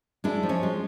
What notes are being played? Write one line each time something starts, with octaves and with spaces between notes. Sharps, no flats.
G#3 D4 E4
F3
C#4
G#3